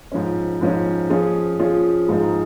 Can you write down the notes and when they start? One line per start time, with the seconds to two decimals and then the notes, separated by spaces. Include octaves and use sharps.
0.12 G#2 F3 C#4
0.61 G#2 F3 C#4
1.10 F3 C#4 F4 G#4
1.59 F3 C#4 F4 G#4
2.08 G#2 F3 G#3 D#4 G#4